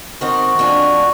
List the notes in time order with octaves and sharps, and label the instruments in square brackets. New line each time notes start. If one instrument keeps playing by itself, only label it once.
[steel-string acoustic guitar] D#3 C4 [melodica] F#4
[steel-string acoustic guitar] F2 D4 G#5